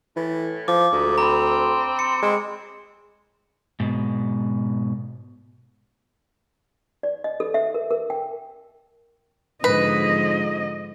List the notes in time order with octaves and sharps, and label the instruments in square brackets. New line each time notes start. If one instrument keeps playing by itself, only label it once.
[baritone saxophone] A2 [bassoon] E3
[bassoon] F3 [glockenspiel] D6
[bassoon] D2 [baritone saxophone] G#2
[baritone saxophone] C4 [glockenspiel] A#5 B5
[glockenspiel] C#7
[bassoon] G#3 [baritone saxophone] C4
[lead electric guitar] G#2 B2
[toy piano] D5
D#5
A4
E5
A#4
A#4
G5
[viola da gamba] G#2 D3 F3 [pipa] B4 [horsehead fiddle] D#5